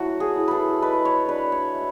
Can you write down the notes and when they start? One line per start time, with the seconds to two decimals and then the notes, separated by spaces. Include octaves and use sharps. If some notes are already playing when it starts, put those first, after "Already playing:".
Already playing: F#3 A3 E4 F#4
0.20 G#4
0.35 E4
0.48 A4 B4
0.82 G#3 B4
1.05 C#5
1.28 D4 B4
1.52 C#5
1.75 A3